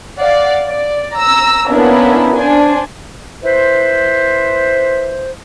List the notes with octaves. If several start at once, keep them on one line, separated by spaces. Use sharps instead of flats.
D5 F5 F#5
D5
A#5 E6
A#3 B3 C#4 D4 E4 A#4
D4 C5 G#5
E4 B4 C5